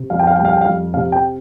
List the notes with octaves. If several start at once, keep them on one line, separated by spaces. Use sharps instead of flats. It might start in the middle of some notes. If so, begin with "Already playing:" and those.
Already playing: C3
F2 F5
G5
F5
G3 G5
F5
G5
F2 F5
C3 F5
G5